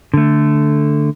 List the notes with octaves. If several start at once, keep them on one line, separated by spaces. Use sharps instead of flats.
D3 A3